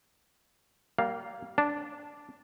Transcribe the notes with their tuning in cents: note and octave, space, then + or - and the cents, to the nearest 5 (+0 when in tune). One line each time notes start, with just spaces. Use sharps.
G3 -30 A#3 +0 F5 +0
D4 -10 A5 +0